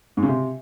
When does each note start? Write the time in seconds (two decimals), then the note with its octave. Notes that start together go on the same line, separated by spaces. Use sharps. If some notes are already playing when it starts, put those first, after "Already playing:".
0.17 G#2
0.23 C#3
0.28 C3